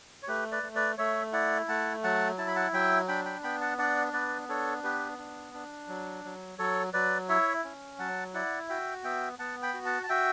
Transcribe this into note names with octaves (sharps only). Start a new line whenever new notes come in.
C#5
A3 G4 B4
B4 D5
A3
B4 D5
A3 C#5 E5
E4 D5 F#5
A3 F#5 A5
F#3 F#5 A5
E4 A5
B5
F#5 A5
F#3 E5 G5
D4 G5 B5
G5 B5
B3 G5 B5
F#5 A5
D4 D5 F#5
B3 B4 D5
D4 A4 C#5
B3 G4 B4
D4
D4
F#3
F#3
F#3 A4 C#5
F#3 B4 D5
E4 C#5 E5
C#4
F#3 F#5 A5
E4 D5 F#5
F#4 E5 G5
B3 E5 G5
B3 F#5 A5
G5 B5
F#4
F#5 A5
A5
F#4 E5 G5